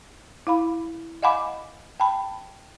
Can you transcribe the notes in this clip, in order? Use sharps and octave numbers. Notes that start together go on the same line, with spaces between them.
E4 F5 B5
D#5 F5 F#5 G#5 B5 D6
G5 A5 B5